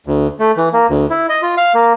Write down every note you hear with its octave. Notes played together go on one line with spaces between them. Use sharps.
D2
A3
E3
A#3
D2
E4
D#5
F4
F5
A#3